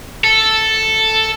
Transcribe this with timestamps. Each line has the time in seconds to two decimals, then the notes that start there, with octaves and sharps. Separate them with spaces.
0.24 A4